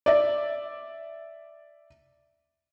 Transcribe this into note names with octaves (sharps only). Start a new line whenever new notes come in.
D5 E5